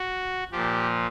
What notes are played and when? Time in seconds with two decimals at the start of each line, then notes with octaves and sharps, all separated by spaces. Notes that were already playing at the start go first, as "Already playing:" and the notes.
Already playing: F#4
0.52 A#2 F3 G4